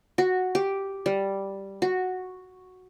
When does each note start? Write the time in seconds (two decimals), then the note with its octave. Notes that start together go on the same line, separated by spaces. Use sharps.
0.18 F#4
0.55 G4
1.06 G3
1.82 F#4